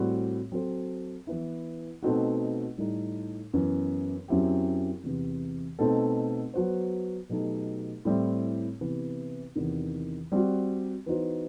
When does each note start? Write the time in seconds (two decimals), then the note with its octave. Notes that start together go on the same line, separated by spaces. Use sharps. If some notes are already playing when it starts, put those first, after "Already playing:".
Already playing: A2 G3 C4 F#4
0.52 F#3 C4 F#4 A4 C5
1.27 E3 B3 E4
2.03 B2 A3 C4 D#4 F#4
2.78 A2 G3 D#4 A4
3.53 F#2 E3 B3
4.28 F#2 F#3 C4 E4 G4
5.04 E2 C3 E3
5.79 B2 A3 C4 D#4 A4
6.54 F#3 B3 F#4 C5
7.29 B2 F#3 A3 D#4 G4
8.05 A2 G3 C4 E4
8.81 C3 E3 B3
9.55 E2 C3 D#3
10.32 G3 C4 F#4
11.06 E3 B3 D#4 F#4 C5